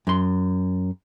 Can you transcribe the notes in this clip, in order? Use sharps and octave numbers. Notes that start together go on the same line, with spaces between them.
F#2 C6